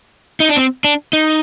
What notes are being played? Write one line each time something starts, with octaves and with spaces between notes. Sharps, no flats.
D#4
D4
C4
D4
D#4